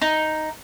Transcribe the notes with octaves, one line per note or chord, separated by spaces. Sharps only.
D#4